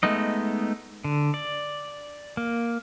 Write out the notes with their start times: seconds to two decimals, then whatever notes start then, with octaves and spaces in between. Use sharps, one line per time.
0.03 G#3 A3 B3 D#4 D#5
1.04 D3
1.34 D5
2.37 A#3